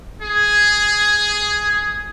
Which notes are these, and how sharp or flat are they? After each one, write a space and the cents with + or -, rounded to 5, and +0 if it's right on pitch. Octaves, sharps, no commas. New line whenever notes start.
G#4 +0